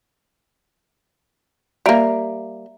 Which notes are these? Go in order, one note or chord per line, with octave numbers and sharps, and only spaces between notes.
G3 A#3 E5 A#5 D7